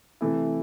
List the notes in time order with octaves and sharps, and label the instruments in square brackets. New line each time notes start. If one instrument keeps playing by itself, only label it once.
[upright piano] C3 E3 A3 E4